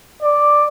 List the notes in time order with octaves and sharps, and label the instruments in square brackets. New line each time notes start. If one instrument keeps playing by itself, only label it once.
[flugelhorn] D5